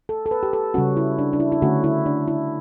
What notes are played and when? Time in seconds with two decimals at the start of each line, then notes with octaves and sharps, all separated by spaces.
0.09 A4
0.26 A4
0.31 B4
0.43 G4
0.53 A4
0.74 C#3 G3 C#4 F#4
0.97 E4
1.19 D4
1.33 D4
1.40 E4
1.52 E4
1.62 D3 A3 C#4 F#4
1.84 E4
2.06 D4
2.28 E4